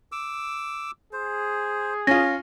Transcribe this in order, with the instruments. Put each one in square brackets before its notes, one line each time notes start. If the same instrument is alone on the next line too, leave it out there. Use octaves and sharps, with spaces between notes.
[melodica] D6 E6
[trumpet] G#4 [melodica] C5
[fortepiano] C#4 F4 [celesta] A#6